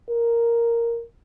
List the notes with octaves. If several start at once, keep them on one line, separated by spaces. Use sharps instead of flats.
A#4